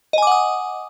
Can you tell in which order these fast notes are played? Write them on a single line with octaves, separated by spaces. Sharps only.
D#5 G#5 D6 F#5 D#6